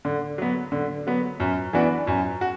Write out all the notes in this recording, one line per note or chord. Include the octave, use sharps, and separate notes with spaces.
D3
F#3 B3
D3
F#3 B3
F#2
E3 B3 D4 F#4
F#2
F#4